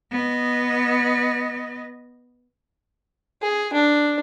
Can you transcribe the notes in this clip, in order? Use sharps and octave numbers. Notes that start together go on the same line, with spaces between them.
B3 D#5
G#4
D4